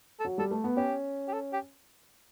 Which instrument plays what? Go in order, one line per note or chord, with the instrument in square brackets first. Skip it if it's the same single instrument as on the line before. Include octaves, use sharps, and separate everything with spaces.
[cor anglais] A4
[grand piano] F#3
[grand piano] G3 [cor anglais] A4
[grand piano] A3
B3
[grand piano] C#4 [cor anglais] G4
[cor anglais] G4
A4
G4